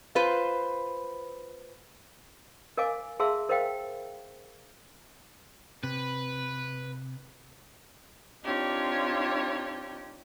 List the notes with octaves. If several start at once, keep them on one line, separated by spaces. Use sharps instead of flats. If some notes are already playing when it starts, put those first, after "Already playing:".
F4 B4 C5
A#4 D#5 F5 G#5 D6
G#4 E5 F5 A5 C6 E6
A#4 C5 D#5 F5 G5
C3 B4
C4 D4 D#4 F4 G4 C#5